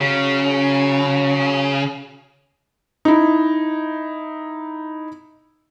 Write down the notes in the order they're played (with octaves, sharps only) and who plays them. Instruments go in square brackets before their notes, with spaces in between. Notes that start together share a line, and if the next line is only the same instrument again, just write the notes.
[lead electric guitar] C#3 [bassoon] F#3
[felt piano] D#4 E4